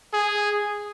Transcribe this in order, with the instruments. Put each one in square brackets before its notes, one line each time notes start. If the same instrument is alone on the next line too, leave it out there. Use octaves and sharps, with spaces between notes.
[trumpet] G#4